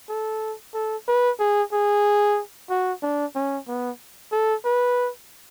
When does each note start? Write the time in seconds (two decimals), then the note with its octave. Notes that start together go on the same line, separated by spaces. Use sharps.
0.09 A4
0.74 A4
1.08 B4
1.40 G#4
1.73 G#4
2.70 F#4
3.03 D4
3.36 C#4
3.68 B3
4.32 A4
4.65 B4